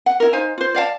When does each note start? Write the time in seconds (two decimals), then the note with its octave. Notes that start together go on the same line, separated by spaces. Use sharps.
0.06 F#5
0.20 E4 A#4
0.33 D#4 C5 F5 G#5
0.58 F4 C5
0.74 D5 F5 F#5 A5